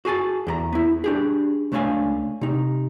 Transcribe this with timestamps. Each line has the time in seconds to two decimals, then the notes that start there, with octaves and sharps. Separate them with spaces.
0.05 F#4 G#4 G#5 A5
0.47 E2 G4 A#5
0.73 B3 E4
1.04 D4 G4 G#4
1.72 C#2 A3 D4 C#5 F5 G#5
2.41 C3 D#4